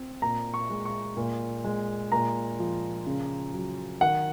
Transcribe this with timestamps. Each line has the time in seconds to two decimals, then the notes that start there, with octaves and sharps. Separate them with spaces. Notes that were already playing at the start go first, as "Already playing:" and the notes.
Already playing: C4
0.22 A#2 A#5
0.54 C#6
0.69 G#3
0.85 C#6
1.17 A#2
1.64 G#3
2.12 A#2 A#5
2.59 F3
3.07 C#3
3.54 F#3
4.01 D#3 F#5